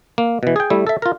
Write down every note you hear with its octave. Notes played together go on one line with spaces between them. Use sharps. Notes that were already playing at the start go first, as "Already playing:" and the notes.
A#3
B2 E3
G#4 G5
G3 A3 E4
A4 E5
F4 A#4